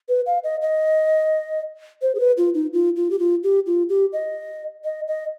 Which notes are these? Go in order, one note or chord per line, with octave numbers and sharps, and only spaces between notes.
B4
F5
D#5
D#5
C5
G#4
B4
F4
D#4
F4
F4
G4
F4
G4
F4
G4
D#5
D#5
D#5